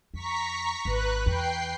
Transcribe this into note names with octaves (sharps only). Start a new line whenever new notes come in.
F2 A#5 C#6 B6
G#1 B4 F#6
E2 G5 C7